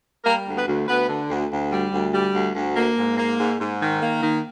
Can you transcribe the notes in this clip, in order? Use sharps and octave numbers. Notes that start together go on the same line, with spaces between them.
G3 A#3 A#4
D2
B3 B4
D2
D2 B3 B4
D3
D2
D2
G3
D2
G3
D2
D2
A#3
G#2
A#3
G#2
G#2
D#3
A#3
D#3